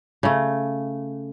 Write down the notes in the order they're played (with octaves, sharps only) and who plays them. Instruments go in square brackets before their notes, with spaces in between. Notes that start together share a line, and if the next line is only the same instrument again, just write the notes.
[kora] C#3 A3